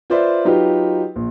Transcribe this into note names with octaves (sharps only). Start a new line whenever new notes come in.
F4 B4 C5 D5 E5
F#3 D#4 F4 G4 B4
A#1